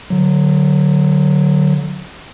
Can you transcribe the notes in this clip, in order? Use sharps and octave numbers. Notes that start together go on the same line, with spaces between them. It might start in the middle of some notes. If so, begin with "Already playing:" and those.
D3 F#3